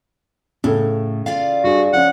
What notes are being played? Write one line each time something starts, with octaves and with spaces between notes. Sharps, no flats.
A2 C#3 A4
F4 D5 F5
G2 F#4 G#4
F3 C#4 F#5